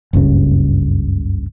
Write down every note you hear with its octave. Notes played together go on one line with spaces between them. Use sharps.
F#1 C#2 G2 C#3